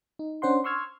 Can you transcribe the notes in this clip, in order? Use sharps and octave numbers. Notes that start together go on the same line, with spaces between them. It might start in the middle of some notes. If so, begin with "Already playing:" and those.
D#4
C#4 D4 C5 F#5 C6
C6 C#6 E6 F6 G#6